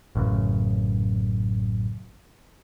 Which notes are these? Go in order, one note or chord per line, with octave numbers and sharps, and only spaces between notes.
A1 F#2 C#3